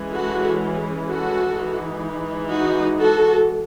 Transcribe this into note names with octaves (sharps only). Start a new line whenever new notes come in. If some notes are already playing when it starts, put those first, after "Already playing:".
Already playing: E3 G#3 C#4
F#4 A4
F#4 A4
E3 G#3 D#4
D#4 F#4
F#4 A4